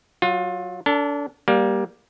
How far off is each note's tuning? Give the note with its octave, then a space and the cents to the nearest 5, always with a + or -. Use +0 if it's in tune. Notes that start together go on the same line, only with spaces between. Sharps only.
F#3 +0 F4 +25
D4 -30 A4 +35
G3 +0 A#3 +20